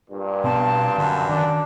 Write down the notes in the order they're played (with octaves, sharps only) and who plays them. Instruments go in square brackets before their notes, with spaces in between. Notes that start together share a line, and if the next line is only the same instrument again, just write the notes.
[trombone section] G2 A#2
[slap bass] B2 B3 [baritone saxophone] C4 [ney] A5
[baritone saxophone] F#2 [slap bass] D3
[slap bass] D#3 [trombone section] D4